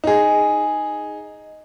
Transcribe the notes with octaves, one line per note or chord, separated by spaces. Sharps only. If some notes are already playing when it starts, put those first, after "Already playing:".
D#4 G#4